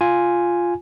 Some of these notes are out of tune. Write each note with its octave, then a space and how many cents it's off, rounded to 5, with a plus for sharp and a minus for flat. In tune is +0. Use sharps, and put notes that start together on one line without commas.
F4 +0 G#5 +0